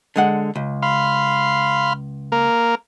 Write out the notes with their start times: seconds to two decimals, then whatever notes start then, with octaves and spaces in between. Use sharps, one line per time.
0.16 D3 G#3 F#5
0.56 C#2
0.82 F5 B5 C6
2.32 A#3 A#4